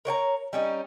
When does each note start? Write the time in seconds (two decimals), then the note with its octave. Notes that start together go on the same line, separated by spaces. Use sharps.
0.05 A#4 C#5 G5 A#5
0.53 G3 C#4 D#4